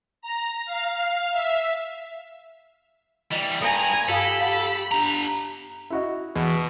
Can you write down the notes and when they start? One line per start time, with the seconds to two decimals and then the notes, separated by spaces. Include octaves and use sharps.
0.22 A#5
0.65 F5
1.31 E5
3.32 E3 G3 D#5
3.62 G2 G#5 A#5 D#6 A#6
4.09 G2 G4 A4 F5 B5 D#6
4.41 F5 F#5
4.92 D4 A#5
5.90 E4 F#4 D#5
6.36 E2 B2